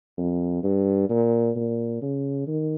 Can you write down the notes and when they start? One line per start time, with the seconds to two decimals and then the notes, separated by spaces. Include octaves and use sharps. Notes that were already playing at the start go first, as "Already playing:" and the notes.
0.17 F2
0.63 G2
1.09 A#2
1.56 A#2
2.02 C#3
2.47 D#3